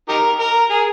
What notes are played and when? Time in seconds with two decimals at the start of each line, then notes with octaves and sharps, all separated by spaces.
0.09 D#4 G4 A#4
0.40 A#4
0.70 G#4